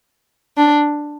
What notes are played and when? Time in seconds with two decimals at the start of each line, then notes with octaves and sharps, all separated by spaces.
0.57 D4